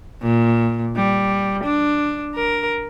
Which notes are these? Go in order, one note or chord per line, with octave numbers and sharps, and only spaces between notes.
A#2
G3
D4
A#4